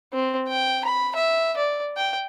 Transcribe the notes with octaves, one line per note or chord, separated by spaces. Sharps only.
C4
G5
B5
E5
D5
G5